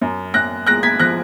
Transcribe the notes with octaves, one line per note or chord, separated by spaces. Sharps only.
F#2
F#2 F#6 A#6
G#3 F#6 A#6
G#6 B6
F3 F#6 A#6